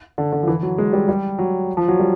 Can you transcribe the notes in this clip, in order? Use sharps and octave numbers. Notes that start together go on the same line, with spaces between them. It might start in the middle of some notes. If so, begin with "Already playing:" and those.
D3
D3
F3
E3
F#3
G#3
G3
G3
F#3
F3
F#3
G3